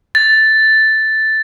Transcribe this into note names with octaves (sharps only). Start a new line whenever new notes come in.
A6